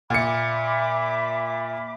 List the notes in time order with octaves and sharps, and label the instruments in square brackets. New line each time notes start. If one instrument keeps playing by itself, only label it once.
[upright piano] A#2 C#7 [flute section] E5 B5 D6